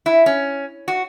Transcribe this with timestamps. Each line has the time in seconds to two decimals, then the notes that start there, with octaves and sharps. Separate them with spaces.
0.06 E4
0.26 C#4
0.88 F#4